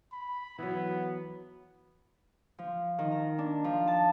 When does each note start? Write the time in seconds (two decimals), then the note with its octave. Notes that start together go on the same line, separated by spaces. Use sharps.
0.13 B5
0.59 E3 F#3 B3
2.59 F3
2.99 D#3
3.11 A#5
3.38 D4
3.64 F3
3.87 A5